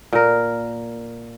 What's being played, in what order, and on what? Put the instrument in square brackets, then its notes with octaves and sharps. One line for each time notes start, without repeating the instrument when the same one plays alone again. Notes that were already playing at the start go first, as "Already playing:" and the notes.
[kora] A#2 A#4